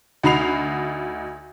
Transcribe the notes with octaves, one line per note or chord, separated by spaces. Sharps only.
D2 D#4 F#4 B5 C7 F7